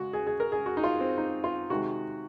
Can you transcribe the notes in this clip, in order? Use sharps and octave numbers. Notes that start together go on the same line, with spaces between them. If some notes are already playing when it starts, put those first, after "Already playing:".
Already playing: C#3 G#3 F#4
G#4
G#4
A#4
G#4
F#4
D#4
F4
C4
D#4
F4
C3 D#3 G#3 F#4